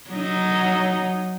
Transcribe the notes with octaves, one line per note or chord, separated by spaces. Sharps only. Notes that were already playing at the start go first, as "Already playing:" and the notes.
F#3 D#4